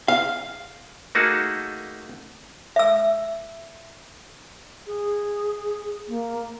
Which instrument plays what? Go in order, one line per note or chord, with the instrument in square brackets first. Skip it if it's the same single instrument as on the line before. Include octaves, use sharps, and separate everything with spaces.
[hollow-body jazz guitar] F5
[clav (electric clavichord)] A3 A#3 D#4 F#4 G#4 A5
[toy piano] E5 E6
[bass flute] G#4
A#3